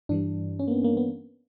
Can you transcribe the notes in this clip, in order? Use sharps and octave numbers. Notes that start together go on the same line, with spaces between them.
G2 E3 G3 D4
C#4
A#3
B3
A#3
B3